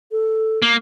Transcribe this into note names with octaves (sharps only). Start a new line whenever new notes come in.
A4
A#3